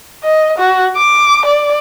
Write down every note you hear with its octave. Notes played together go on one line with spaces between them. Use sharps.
D#5
F#4
D6
D5